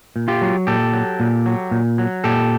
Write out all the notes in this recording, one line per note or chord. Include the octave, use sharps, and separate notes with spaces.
A#2
F4 G4
F#3
A#2 G4 A4
F#3
A#2
F#3
A#2
F#3
A#2 G4 A4